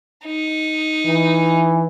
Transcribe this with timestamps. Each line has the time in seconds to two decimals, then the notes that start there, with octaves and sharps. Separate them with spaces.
0.26 D#4
1.05 E3